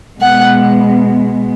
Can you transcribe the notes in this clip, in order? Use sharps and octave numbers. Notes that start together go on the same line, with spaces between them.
B2 G#3 B3 F#5